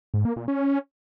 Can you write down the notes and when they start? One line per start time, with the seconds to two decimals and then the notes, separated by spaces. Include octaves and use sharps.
0.14 G#2
0.25 A#3
0.37 A#2
0.48 C#4